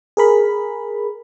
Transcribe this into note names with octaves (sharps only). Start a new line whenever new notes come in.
G#4 A#4 B5